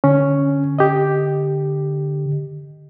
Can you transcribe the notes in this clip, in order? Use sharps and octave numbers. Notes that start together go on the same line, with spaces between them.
D3 C#4
G4 D#5